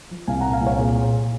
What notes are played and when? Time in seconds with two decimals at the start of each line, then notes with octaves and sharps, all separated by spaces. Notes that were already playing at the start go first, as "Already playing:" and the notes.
0.11 F3
0.27 C2 F5 G#5
0.40 F#5 A#5
0.45 A#2
0.53 F5 G#5
0.61 C2
0.67 C#5 F5
0.78 A#2 G#4